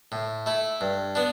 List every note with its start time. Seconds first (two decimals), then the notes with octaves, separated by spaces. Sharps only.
0.12 A2
0.46 A3 E4
0.81 G2
1.15 B3 D4